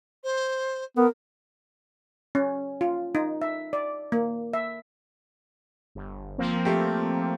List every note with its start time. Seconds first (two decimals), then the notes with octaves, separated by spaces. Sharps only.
0.24 C5
0.97 B3 A#4
2.35 C#4
2.81 F4
3.15 D#4
3.42 E5
3.73 D5
4.12 A#3
4.53 E5
5.95 G1
6.38 F3 A#3 C4
6.65 A3 G4